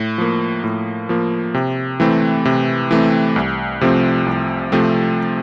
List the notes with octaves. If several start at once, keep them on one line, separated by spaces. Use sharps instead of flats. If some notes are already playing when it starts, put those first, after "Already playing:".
Already playing: A2
F3 A#3
A2
F3 A#3
C3
E3 A3 C4
C3
E3 A3 C4
C2
C3 F3 A3 C4
C2
C3 F3 A3 C4